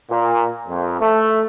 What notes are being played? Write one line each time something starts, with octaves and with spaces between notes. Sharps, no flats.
A#2
F2
A3